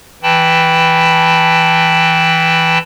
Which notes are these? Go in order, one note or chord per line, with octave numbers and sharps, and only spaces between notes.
E3 G5 A5 B5